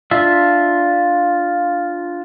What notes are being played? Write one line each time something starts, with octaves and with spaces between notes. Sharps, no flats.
D4 F4 E5